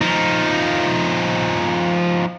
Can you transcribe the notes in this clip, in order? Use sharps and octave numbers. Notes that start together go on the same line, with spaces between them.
F3 D#4